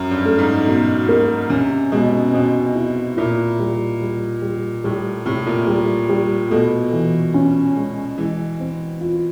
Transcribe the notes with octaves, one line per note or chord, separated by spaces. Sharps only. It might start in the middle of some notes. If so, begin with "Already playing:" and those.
Already playing: F#2
G2
A3
G#2
B2
A#3
C3 C#4
B2 G#3
B2 C4
E4
A#2 E4
G3
G3
G3
A2 G3
A2 C3
A#2
G3
G3
B2 A3
E3
C#4
G#3
E3 G#3
C4
F4